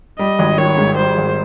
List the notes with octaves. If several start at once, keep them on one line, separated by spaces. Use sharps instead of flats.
G3 D#5
G#1
D#3 C#5
G#2
G3 C5
G#1